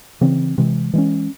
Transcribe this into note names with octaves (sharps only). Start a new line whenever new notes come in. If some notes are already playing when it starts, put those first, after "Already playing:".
C#3 E3 C4
C3 E3 G#3
E3 G#3 C#4